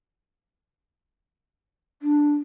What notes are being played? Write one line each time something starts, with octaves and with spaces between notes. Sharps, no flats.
D4